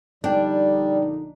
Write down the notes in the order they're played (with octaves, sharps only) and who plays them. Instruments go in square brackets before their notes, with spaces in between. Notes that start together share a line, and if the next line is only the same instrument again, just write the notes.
[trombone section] A#1 D3 D#4 [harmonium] G3 [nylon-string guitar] D4 [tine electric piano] D5 G5